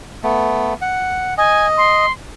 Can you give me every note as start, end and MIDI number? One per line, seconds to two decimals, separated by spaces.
0.23 0.74 57
0.23 0.74 59
0.81 1.34 78
1.38 2.06 75
1.38 1.67 80
1.77 2.12 84